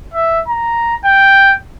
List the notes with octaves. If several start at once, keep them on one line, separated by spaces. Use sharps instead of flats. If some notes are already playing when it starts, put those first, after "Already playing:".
E5
A#5
G5